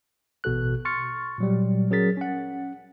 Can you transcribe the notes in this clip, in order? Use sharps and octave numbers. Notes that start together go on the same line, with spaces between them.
A1 B2 F#4 A4 F#6
C6 C#6 F6 A6 C#7
A#2 F#3 G3
F#3 C#4 G#4 A#4 A6 B6
C#4 F#5